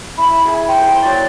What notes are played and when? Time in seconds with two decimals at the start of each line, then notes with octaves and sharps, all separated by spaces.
0.18 E4 B5
0.45 G#4 G#5
0.68 C5 G5
0.82 C5 A#5
1.02 F#3 A#3 D5